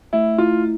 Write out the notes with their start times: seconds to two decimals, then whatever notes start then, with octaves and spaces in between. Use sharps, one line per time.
0.13 A3 E4
0.38 E4 F4